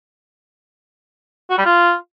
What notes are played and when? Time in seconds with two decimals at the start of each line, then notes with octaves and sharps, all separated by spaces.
1.50 F#4
1.58 G3
1.66 F4